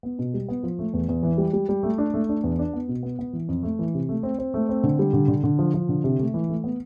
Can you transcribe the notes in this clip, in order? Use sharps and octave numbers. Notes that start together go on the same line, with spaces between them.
B3
B2
G3
B3
F3
A3
E2
E2
E3
G3
G3
G3
A3
D4
A3
D4
E2
D4
B3
B2
B3
B3
E3
F2
A3
E3
C3
A3
C4
C4
A3
C4
D3
G3
D3
D3
D3
F3
F3
D3
C3
A3
E3
A3
B3